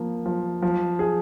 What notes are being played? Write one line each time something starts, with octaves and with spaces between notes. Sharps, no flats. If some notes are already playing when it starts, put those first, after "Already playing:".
Already playing: F3 A#3
F3
F3
G#4